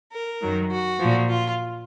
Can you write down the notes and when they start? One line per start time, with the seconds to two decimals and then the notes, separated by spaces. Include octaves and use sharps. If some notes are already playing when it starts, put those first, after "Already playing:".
0.12 A#4
0.41 F#2 D#3 F#3
0.71 F#4
1.00 A#2 F3
1.29 F4